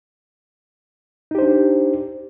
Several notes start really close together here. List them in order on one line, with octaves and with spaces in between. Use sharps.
D#4 G4 C5 D4